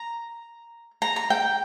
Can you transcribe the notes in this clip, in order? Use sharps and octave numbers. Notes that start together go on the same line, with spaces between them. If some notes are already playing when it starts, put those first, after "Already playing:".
Already playing: A#5
A#5
A#5
G5